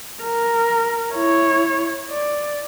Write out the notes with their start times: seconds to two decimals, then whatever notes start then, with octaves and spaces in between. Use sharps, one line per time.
0.23 A#4
1.14 E4 C#5
2.10 D5